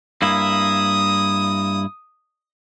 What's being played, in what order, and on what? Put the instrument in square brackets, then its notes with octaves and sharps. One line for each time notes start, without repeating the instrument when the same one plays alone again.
[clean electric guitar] G2 A#3 E4 [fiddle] D#6